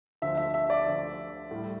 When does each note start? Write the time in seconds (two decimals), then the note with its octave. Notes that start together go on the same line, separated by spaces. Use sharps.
0.22 D2 D3 F3 E5
0.37 E5
0.54 E5
0.70 D5
0.86 D2 D3 F3
1.51 A2 G3